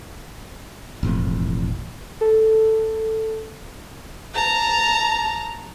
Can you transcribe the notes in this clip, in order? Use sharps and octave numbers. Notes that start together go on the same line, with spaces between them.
E1 A1 F2
A4
A5 A#5